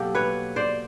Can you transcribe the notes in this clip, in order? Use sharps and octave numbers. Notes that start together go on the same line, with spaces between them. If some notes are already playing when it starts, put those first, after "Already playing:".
Already playing: B2 F#3 A#3 G4 A4
B4 C#5
C5 D5